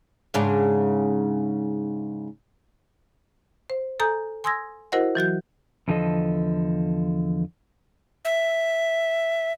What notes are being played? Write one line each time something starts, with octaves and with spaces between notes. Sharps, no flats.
G#2 C#3 D4
C5
A4 G#5 A#5 D#6 G6
G#5 C6 D#6 E6 G#6 A#6
E4 F#4 A#4 C5 D#5 F#5
E3 F#3 F#4 G6
E2 D3 F3 A4 D#5
E5